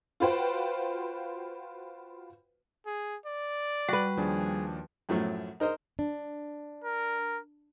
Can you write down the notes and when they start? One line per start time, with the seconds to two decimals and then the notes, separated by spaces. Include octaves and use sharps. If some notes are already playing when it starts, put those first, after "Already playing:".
0.20 F4 F#4 B4 C5 G5
2.86 G#4
3.26 D5
3.89 G3 F#4 B4
4.17 D#2 F3 D4 G#4
5.09 F#2 A2 F3 F#3 A3
5.60 D#4 A#4 C5 D#5
5.99 D4
6.84 A#4